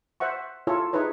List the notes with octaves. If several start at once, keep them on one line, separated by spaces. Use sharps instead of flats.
C5 E5 F#5 C#6
E4 F4 A4 C#5
D#4 E4 G#4 B4 C#5